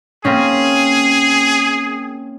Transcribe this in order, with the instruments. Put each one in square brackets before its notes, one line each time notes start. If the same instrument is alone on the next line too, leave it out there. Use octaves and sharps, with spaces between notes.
[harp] A#3 C4 C#4 [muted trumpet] G#4